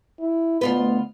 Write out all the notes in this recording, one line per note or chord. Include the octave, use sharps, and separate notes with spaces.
E4
D2 B3 F4 B4